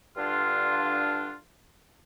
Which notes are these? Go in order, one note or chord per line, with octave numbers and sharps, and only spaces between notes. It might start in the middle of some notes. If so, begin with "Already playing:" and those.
G2 D3 D4 F4